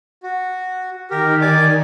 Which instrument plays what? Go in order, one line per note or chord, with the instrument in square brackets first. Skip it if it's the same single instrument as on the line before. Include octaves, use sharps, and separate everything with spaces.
[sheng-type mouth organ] F#4
[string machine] D#3 [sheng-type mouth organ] G4 A#4
[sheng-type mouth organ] D5 G#5 D6